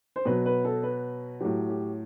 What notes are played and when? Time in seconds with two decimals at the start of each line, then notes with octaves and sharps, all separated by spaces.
0.16 C5
0.25 B2 F#3 B4
0.46 B4
0.65 A4
0.83 B4
1.40 A2 F#3 G4
1.69 G4